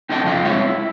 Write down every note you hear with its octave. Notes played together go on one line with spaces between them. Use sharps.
C4 D#4 A4 D#5 G5 A5
F2 C#3 F4 D#5
G#3 C4 D#4 C#5 E5
E4